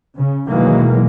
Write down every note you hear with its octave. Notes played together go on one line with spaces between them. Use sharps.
C#3
B2 D#3 E3 F#3 G#3 A#3